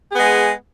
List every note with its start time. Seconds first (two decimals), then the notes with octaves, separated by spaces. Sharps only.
0.10 G#4
0.15 B3
0.19 G#3